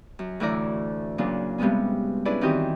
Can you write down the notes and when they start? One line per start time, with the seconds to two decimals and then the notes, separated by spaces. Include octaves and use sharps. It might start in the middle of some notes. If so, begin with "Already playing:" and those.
0.19 F#2
0.40 D2 A2 E3 E4 D5 A#5
1.18 A#2 C#3 F#3 D4
1.58 G2 C3 G#3 B3 C#4
2.25 C#4 D4 E4 G#4 B4 D5
2.41 D#3 E3 C4 F#4 G4 D#5